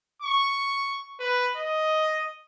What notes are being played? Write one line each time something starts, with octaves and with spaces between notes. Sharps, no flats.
C#6
B4
D#5